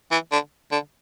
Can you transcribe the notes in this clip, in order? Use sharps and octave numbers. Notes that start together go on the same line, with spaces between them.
E3
D3
D3